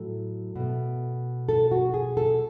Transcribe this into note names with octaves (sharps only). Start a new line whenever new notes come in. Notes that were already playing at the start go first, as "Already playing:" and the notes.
Already playing: A2 F#3 A4
B2 A3
A4
F#4
G#4
A4